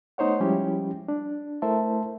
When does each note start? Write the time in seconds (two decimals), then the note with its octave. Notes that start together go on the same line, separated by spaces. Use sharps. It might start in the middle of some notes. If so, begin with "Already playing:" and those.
0.18 A3 B3 D#4 C5 C#5 F#5
0.40 F3 G3 G#3 C#4 E4 G4
1.08 D4
1.62 A3 E4 A#4 C5 E5 A5